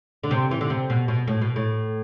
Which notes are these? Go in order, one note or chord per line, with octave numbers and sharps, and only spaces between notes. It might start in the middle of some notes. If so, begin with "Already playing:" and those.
D3
C3
E3
D3
C3
B2
B2
A2
B2
A2